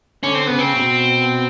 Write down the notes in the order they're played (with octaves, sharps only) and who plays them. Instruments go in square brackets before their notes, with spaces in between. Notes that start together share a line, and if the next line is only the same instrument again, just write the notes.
[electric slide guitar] D3 [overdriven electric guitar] C#4
[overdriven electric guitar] C4
[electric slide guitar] C#3 [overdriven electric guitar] B3
[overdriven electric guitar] C4
[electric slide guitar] B2